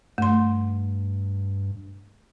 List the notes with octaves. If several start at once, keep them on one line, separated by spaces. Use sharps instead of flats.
G2 A3 C6